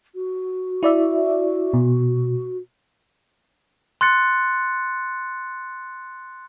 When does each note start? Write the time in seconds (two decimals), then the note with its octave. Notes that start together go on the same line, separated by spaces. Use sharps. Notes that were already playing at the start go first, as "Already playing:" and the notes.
0.15 F#4
0.83 E4 D5 E5
1.73 B2
4.01 C6 F#6 A6 C#7